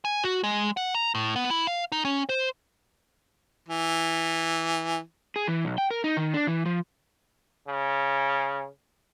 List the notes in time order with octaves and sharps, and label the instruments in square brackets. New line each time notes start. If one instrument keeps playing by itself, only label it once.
[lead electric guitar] G#5
F#4
G#3
F#5
A#5
A2
B3
E4
F5
D#4
C#4
C5
[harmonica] E3
[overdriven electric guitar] G#4
E3
B1
G5
A#4
D#4
D#3
D4
E3
F3
[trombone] C#3